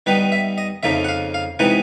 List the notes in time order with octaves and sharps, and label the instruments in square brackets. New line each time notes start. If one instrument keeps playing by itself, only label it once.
[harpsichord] D#3 G3 B3 D#4 B4
E5
D#5
F2 C#3 F3 A#3 D#4 E5
F#5
F5
F5
C3 E3 G#3 B3 D#4 F#5